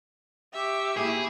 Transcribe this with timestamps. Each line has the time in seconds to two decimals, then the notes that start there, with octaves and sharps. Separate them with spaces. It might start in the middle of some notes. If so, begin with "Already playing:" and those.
0.53 G4 E5 C#6 D6
0.97 G#2 A#3 E4 G#4